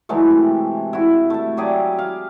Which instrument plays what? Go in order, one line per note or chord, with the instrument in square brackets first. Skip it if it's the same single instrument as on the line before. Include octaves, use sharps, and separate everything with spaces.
[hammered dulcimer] E3 F#3 G#3 A3
C3
E4 F#4
A3 A5
F#3 G4 G#4 D5
F5